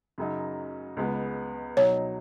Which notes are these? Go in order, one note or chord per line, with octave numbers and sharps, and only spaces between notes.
F#2 C#3 F#3 D#4
C#2 C#3 G#3 B3
B2 F#3 D#4 C#5